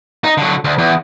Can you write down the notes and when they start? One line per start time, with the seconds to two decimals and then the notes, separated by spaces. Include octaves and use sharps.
0.24 D#4
0.37 D3 F#3
0.64 D2
0.78 E2